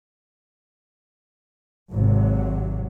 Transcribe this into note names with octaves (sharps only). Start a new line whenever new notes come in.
G#1 C3 F#3